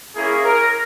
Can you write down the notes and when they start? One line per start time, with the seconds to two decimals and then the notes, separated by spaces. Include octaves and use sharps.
0.15 A#3 C#4 E4 G#4
0.44 A#4